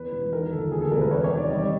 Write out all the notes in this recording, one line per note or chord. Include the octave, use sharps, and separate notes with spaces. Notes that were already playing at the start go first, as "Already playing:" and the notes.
Already playing: E2 B4
E1
D#3 A#4
G1 A4
D2 G#4
A4
E1 A#4
B4
C3 C#5
C#5
D#3
D5
G3 D#5
D5